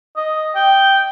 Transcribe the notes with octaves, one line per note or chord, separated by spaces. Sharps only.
D#5
G5